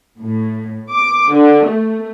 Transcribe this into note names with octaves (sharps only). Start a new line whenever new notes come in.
A2
D6
D3
A3